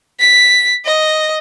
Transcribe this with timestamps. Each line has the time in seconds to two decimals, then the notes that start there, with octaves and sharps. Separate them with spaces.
0.20 B6
0.86 D#5